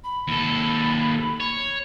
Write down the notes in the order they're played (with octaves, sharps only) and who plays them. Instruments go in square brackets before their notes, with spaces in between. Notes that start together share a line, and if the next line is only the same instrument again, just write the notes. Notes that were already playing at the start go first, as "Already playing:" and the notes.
[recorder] B5
[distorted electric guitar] D#2 A4
C#5